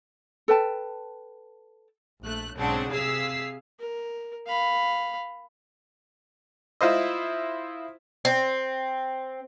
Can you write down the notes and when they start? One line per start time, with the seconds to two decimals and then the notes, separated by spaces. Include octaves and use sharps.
0.48 A4 B4 G5 A5
2.23 A#1 A3 F#6
2.57 B1 G#2 C#3 C4 D4 F#5
2.91 C3 G#4 F5 E6 B6 C7
3.80 A#4
4.47 F5 B5
6.81 E4 F4 C5 D#5
8.25 C4